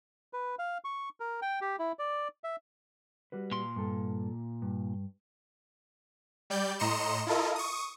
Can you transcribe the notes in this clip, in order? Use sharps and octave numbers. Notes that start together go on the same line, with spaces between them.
B4
F5
C#6
A#4
G5
G4
E4
D5
E5
G3 F#4 B4
A#2 C6
G2 A4
G2
G3 D5 G6
A2 D#5 A#5 C6 C#7 E7
E4 F4 A4 A#4 D#5
C#6 D#6